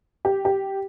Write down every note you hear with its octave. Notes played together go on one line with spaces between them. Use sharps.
G4
G4